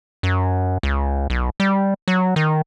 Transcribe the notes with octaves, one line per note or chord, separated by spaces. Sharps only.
F#2
C#2
B1
G3
F#3
D#3